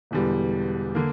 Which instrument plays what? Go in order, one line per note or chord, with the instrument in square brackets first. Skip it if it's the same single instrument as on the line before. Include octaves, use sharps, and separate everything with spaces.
[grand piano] E1 E2 D3 G3
D3 A#3